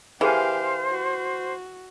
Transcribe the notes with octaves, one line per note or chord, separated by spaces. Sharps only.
E3 G4 G#4 A#4 C5 F5 G#5
F#4